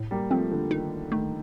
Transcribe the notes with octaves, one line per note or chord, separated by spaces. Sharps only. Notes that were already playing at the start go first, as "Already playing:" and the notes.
Already playing: A2
G3 A#3
F3 A3 C4
D3 F3
D#3 D#4
D#3 A3